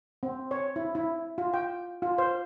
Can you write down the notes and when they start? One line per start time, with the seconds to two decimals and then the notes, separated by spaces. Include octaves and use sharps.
0.23 C4
0.51 C#5
0.76 E4
0.95 E4
1.38 F4
1.54 G5
2.02 F4
2.18 C5